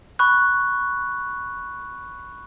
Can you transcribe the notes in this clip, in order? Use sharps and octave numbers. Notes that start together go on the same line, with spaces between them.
B5 C#6 F#6